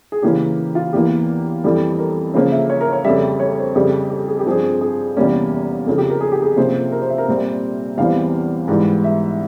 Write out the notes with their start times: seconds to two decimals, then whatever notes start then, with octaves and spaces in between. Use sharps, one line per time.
0.12 G#4
0.22 C#3 E3 A#3 C#4 G4
0.75 F4
0.93 E2 E3 A#3 G4
1.64 F2 E3 G3
1.99 A#4
2.34 C#3 F3 A#3 C#4 C5
2.52 E5
2.70 C#5
2.81 A#4
2.93 C#5
3.04 F2 C#3 G3 E5
3.22 E5
3.40 C#5
3.58 C5
3.75 F2 C#3 G3 G4
4.10 G4
4.27 G#4
4.39 G4
4.46 G2 F3 C4 G#4
4.81 G#4
5.17 E2 C3 G3 A#3 C#4
5.86 F2 C#3 F3
5.98 G4
6.10 A#4
6.21 G#4
6.32 G4
6.42 G#4
6.56 C3 F3 A#3 C#4 C5
6.92 A#4
7.02 C5
7.10 E5
7.18 A#4
7.28 A#2 G3 C4
7.97 E2 E3 G3 C4 F5
8.68 G#2 E3 G3
9.04 E5